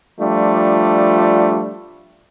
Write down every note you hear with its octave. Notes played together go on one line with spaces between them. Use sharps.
F3 G3 A3 D4 F4